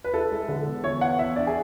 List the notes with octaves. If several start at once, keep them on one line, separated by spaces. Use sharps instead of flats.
B4
E4 A4
G#3
D3
B3
E3 C#5
B3 F#5
E3 E5
D4 D5
G#4